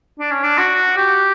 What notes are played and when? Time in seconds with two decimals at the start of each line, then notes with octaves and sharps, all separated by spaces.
0.20 D4
0.31 C#4
0.43 D4
0.58 F#4
0.97 G4